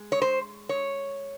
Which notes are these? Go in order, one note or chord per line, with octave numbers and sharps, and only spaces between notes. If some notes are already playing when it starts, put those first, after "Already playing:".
Already playing: G#3
C#5
C5
C#5